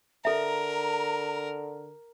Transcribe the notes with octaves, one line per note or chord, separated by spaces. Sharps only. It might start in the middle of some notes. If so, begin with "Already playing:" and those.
D3 A4 A#4 E5 A#5